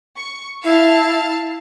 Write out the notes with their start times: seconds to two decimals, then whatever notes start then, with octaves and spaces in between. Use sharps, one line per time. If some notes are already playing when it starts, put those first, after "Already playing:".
0.16 C#6
0.64 E4 F5 A5 F6